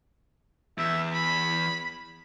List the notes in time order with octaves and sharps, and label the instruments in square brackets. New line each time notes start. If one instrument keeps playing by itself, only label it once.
[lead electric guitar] E2 [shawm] E5
[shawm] B5